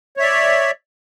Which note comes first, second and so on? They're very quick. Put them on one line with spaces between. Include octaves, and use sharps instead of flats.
C#5 E5 D5